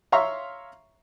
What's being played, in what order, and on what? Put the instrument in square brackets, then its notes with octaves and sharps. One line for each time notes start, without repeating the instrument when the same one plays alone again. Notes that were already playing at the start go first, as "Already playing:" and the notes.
[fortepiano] C#5 E5 F5 A#5 C6 C#6